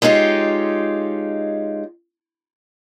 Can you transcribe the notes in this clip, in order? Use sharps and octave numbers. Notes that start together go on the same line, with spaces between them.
G#3 C#4 D#4 F4 G4